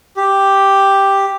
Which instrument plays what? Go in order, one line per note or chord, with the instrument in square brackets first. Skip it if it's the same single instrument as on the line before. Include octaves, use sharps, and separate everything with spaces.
[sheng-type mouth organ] G4